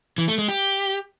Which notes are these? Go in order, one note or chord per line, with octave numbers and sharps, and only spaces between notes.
E3
A3
G#3
G4